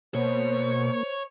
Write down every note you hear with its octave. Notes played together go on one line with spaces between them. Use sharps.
B2 A#3 C5 C#5